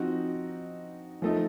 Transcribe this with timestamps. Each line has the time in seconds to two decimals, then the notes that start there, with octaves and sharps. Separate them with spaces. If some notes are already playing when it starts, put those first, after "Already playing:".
Already playing: F3 C4 D#4 F#4
1.22 F3 A3 D#4